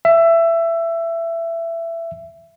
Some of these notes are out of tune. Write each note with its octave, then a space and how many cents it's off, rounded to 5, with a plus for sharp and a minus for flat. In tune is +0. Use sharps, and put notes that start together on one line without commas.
E5 +20